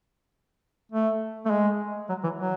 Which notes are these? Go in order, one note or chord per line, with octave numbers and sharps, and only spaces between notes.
A3
A3
G#3
F#3
E3
F#3